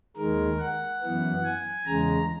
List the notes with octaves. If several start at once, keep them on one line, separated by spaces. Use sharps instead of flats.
D#2 D#3 G#3 A#4
F#5
F#2 E3 B3
G#5
E2 C#3 G#3 A#5